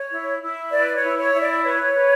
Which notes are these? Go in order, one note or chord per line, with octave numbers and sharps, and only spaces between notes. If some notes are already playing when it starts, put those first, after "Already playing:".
Already playing: C#5
E4
E4
B4 D5
C#5
E4
C#5
E4
D5
B4 C#5
B4